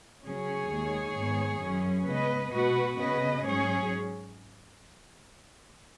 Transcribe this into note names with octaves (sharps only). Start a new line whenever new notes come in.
C#3 F#3 C#4 G#4 C#5
D#2 D#3 G#3
G#2 D#3 G#3 B3
F#2 F#3 C#4
C#3 G#3 B3 B4 D#5
B2 B3 F#4 B4
C#3 B3 B4 D#5
G#2 F#3 C#4 G#4 C#5